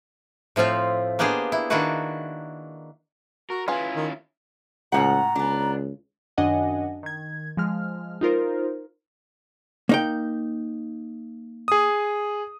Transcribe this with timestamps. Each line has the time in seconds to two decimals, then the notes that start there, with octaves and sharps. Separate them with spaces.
0.56 A2 F3 C4 F4 E5
1.19 A#3 B3 D4 G4 G#4 C5
1.52 E4
1.70 D#3 A#3 D4 E4 F#4 B4
3.50 F#4 A#4
3.68 C#4 E4 F4 G#4 B4
3.95 D#3
4.92 C#2 A2 G#3 F#5 A#5
5.35 C#2 B3 D4
6.37 F#2 D#3 D4 D#5 F#5 G#5
7.03 D#3 G#6
7.57 F3 G#3 F6
8.21 D#4 F4 A#4 C5
9.89 A#3 D#4 G5
11.68 G#4 D#6